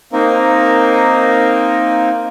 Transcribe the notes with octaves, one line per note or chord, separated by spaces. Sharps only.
A#3 C4 D#4 A#4